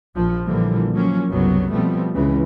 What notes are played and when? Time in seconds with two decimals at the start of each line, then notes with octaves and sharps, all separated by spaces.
0.15 A#1 F3
0.46 A#2 D3 E3 F3 G3 A#3
0.93 F3 F#3 A#3 C#4
1.30 F#1 C2 C3 F#3 B3
1.71 B2 F3 G3 A3 B3 C4
2.14 C#2 C#3 E3 G#3